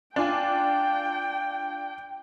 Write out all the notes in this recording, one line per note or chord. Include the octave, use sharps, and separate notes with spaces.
D4 F4 G5 G#5